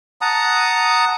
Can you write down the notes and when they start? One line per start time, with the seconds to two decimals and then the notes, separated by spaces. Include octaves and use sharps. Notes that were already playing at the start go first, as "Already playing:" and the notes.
0.21 F#5 A5 A#5 D#6